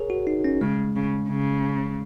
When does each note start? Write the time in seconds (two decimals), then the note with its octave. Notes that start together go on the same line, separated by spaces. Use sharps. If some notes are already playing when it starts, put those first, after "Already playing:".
Already playing: G#4 A#4 C#5
0.10 F#4
0.27 D#4
0.44 C#4
0.61 C#3 G#3
0.96 C#3
1.29 C#3